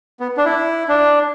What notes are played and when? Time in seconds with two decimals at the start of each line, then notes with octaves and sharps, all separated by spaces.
0.20 B3
0.37 D4
0.45 E4
0.88 D4